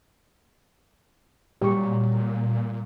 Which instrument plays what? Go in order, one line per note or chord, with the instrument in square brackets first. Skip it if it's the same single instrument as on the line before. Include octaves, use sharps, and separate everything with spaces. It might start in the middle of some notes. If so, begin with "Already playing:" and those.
[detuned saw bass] A#2 [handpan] F#3 G3 [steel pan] G4 C#6